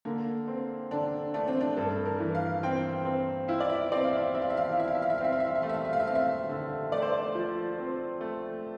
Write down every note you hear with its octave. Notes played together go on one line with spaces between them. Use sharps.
D3 A#3
C4
D3 D4
A3 D4
C4
D4
G2 A4
A#4
E3
F5
C4 G5
C4
E4 F5
D5
E5
C4 D5
F5
E5
C4 E5
F5
E5
F5
E5
F5
E4 E5
F5
E5
F5
E5
F5
C4 E5
F5
E5
F5
E5
A3 F5
E5
F5
E5
F5
E5
C4 F5
E5
D3
A3 D5
C5
D5
F3
C4
A3